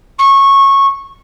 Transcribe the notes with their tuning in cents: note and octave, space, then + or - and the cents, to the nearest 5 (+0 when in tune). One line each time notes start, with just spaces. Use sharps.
C#6 -15